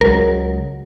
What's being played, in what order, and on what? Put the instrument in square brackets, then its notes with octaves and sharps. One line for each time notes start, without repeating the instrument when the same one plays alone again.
[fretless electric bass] C#2 F#3 G#3 [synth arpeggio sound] A#4